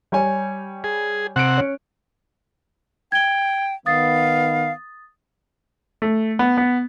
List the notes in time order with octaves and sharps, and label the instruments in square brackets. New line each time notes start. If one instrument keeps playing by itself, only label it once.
[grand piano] G3 C#5 G#5
[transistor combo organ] G#4
[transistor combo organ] C3 F#5 [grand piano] F#6 C#7 D7
[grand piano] C#4
[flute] G5 [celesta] G#6 G7
[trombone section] D#3 B3 [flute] F5 [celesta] D#6 A6
[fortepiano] A3
B3
B3